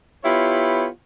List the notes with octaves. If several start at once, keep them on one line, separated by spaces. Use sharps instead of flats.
B3 E4 F4 G4 C#5